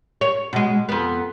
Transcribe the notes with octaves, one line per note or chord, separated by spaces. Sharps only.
C#5
B2 G#3
F2 B3